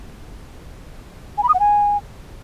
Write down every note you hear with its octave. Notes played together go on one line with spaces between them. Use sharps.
G#5
B5
D#6
F#5
G#5